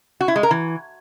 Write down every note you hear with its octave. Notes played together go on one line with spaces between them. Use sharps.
F#4
E4
G#3
A#4
E3